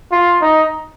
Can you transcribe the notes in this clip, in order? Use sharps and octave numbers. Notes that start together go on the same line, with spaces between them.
F4
D#4